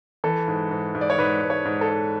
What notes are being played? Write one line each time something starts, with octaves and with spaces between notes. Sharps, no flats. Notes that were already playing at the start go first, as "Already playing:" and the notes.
E3 A4
G#2
G#2
G#2
D5
C#5
G#2 B4
G#2
C#5
G#2
A4
G#2